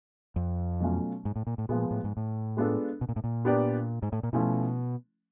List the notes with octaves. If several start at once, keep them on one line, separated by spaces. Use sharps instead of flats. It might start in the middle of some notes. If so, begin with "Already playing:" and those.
F2
B2 F#3 A3 C#4 F4
G#2
A2
A#2
A2
A#2 F3 G#3 B3
A2
G#2
A2
G#3 B3 D4 F4 A4
B2
A#2
A2
A#2
B3 D4 G4 A#4 D5
G#2
A2
A#2
B2 F3 A3 C#4 E4